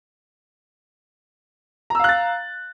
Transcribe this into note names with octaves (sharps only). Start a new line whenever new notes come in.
F5 A#5 E6 F#6 A6